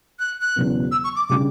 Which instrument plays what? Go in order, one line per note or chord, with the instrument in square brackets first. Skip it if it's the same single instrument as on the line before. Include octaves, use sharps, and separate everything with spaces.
[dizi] F#6
F#6
[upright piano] E1 E2 C#3 F#3 B3
[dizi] E6
C#6
D6
[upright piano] C#3 G3 D4 [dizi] D6